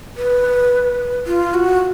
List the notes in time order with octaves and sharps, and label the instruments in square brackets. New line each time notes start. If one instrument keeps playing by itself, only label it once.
[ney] B4
F4
F#4